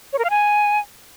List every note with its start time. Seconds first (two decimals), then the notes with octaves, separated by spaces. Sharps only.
0.13 C#5
0.19 A#4
0.24 F5
0.30 G#5